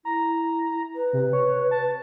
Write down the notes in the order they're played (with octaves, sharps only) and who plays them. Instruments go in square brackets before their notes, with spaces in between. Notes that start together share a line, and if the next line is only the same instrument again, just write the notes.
[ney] E4 [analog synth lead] A#5
[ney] B4
[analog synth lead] C3
C#5
A5